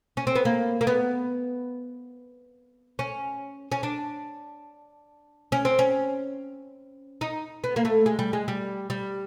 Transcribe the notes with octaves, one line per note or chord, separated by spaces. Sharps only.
C#4
C4
B3
A#3
A#3
B3
C#4
C#4
D4
C#4
C4
C#4
D#4
B3
A#3
A3
G#3
G3
G#3
G3
G3